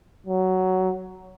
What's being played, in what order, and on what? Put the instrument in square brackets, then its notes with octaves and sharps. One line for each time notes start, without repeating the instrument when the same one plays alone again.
[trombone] F#3